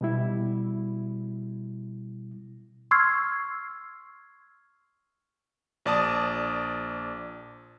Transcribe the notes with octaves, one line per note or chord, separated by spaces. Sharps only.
B2 G3 E4
C6 C#6 E6 F6 G#6 C7
A#1 D5 A5 D#6